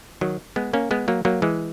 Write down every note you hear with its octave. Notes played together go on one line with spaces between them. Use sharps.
D#3 F#3
G#3 B3
A#3 C#4
G#3 B3
F#3 A#3
F#3 A#3
E3 G#3